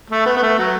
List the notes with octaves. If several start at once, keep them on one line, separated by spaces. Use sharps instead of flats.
A3
B3
B3
A3
F#3